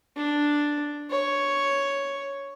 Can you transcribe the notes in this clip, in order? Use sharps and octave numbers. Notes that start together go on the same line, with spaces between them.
D4
C#5